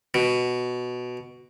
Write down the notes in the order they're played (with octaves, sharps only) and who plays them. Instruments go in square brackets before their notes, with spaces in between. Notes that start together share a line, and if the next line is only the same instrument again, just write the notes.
[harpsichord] B2